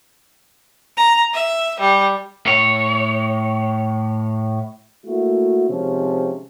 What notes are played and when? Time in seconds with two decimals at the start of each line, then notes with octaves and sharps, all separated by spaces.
0.97 A#5
1.34 E5
1.80 G3
2.46 A2 C#5
5.06 A3 A#3 E4 F#4
5.69 C3 D#3 F3 G#3 C4 C#4